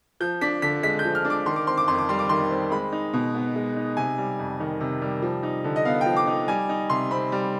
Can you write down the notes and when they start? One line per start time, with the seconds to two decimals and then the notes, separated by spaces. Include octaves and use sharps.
0.20 F3 G6
0.41 D4 B6
0.62 D3 B6
0.83 G#3 B6
0.99 G6
1.05 F3
1.15 F6
1.25 D4
1.30 D6
1.46 D#3 C6
1.56 D6
1.67 C4 C6
1.77 D6
1.88 F2 C6
1.99 D6
2.09 G3 C6
2.19 D6
2.29 D#3 C6
2.51 C4
2.71 G#3 B5
2.92 D#4
3.13 B2
3.35 B3
3.55 G#3
3.76 D#4
3.97 C3 G#5
4.18 G3
4.39 F2
4.60 D#3
4.80 C3
5.02 G3
5.22 F3
5.43 D#4
5.64 D3
5.76 D#5
5.85 B3 F5
6.01 G5
6.06 F3
6.17 D6
6.27 D#4
6.48 G3 G#5
6.69 D#4
6.90 C3 C6
7.11 C4 B5
7.32 G3